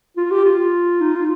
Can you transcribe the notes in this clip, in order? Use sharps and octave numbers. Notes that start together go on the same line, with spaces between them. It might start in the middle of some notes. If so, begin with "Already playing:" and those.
F4
G4
F4
D#4
F4